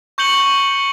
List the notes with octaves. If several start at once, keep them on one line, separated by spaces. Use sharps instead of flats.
C#6 G6 C#7 F#7 G7